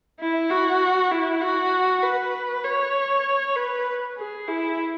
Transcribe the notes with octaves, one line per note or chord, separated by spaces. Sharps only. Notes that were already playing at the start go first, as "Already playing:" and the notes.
E4
F#4
E4
F#4
B4
C#5
B4
G#4
E4